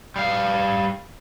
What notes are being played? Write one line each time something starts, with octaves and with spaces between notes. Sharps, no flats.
G3 F5